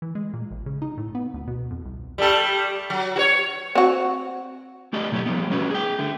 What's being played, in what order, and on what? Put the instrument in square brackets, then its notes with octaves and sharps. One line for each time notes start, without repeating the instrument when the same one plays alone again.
[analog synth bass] E3
G#3
A#2
A1
C#3
D#4
A2
B3
D2
B2
F2
C2
[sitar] G3 A3 A4
F#3
F#4 C#5
[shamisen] C4 F#4
[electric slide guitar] A3 G4 A4 D5 D#5
B2 F#3 A3 F4 G4
F3 G3 B3
G3 A3 C#4 F#4 B4
G#4 G5
D3 A3